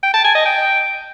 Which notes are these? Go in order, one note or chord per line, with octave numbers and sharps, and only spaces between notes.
G5
A5
G#5
D#5
G5